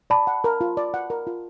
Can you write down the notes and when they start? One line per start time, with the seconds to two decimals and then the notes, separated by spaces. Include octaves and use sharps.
0.10 D5 A5 B5
0.27 F#5
0.44 A#4
0.61 F4
0.77 D5
0.94 F#5
1.10 A#4
1.27 F4